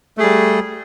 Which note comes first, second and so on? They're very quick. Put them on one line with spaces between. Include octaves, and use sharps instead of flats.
A3 G#4 G3